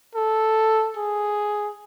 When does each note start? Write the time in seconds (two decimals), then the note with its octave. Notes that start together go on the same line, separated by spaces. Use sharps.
0.15 A4
0.97 G#4